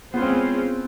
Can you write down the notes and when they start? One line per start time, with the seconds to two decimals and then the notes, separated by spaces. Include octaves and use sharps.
0.14 G#3 B3 C#4 F4 G#4 C5
0.22 C4
0.30 B3